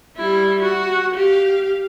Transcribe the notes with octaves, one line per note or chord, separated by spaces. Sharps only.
G3 E4
F#4
G4 F5